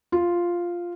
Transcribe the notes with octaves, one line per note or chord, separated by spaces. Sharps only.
F4